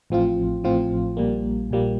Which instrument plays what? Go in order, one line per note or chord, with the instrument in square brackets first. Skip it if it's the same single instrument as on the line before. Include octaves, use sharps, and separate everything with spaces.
[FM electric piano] A1 A2 F3 C4 F4
A1 A2 F3 C4 F4
A#1 A#2 G3 A#3
A#1 A#2 G3 A#3